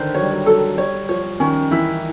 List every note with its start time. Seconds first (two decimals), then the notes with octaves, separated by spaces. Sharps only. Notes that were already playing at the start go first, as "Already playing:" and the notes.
Already playing: D3 D#3 C5
0.14 F#3 C#5
0.22 G3
0.30 F#3
0.46 F#3 A4
0.78 G3 C#5
1.09 F3 C#5
1.40 D#3 C#4
1.71 E3 E4